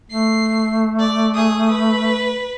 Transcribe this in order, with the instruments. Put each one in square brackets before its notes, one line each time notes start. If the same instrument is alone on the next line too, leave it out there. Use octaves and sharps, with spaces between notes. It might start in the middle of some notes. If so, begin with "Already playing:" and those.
[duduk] A3 [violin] C7
[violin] D5
G#4 D#6
B4